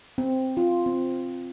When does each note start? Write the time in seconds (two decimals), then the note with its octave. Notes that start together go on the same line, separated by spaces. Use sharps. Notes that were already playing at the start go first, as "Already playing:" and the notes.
0.18 C4
0.57 F4
0.86 C4